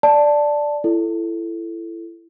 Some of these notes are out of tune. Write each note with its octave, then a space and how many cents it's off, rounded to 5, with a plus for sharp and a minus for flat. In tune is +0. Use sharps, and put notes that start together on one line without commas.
D5 +0 A5 +0
E4 +25 A4 +0